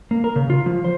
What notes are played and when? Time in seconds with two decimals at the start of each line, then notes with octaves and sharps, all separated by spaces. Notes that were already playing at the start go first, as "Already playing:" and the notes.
0.11 A#3
0.24 A#4
0.36 C#3
0.50 F4
0.66 F3
0.84 C5